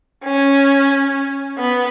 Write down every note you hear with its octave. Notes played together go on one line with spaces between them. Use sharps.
C#4
B3